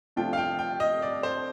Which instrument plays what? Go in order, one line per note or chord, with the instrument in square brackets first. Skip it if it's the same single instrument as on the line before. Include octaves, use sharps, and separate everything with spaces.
[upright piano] C3 F3 A3 D4 F4 [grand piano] G5
[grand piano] F5
G5
G5
D#5
D5
C5